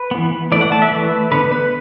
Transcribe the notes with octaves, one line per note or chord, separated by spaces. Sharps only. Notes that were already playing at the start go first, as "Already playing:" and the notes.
Already playing: B4
E3 B3
E3 A3 D5
F#5
A5
E5
E3 A3 B4
D3 B3 B4
B4